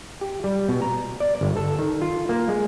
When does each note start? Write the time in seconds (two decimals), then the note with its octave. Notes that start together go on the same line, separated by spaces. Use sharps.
0.21 G4
0.44 G3
0.69 B2
0.82 A#5
1.20 D5
1.41 G1
1.57 A4
1.79 D#3
2.02 F4
2.29 A#3
2.49 G#3